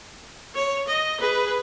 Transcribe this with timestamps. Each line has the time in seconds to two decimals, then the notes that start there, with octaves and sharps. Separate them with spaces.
0.55 C#5
0.87 D#5
1.20 G#4 B4